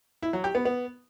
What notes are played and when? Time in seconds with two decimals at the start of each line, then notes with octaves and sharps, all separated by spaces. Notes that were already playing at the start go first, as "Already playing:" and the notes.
0.23 E4
0.33 F#3
0.44 G4
0.55 B3
0.65 B3